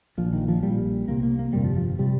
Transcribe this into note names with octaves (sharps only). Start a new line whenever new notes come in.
A#1 A#2 F3
D#3
F3
A#1 A#2 G3
C2 C3 A#3
A#3
A#3
G1 F2 C3 G3
F3
F3
C3 G3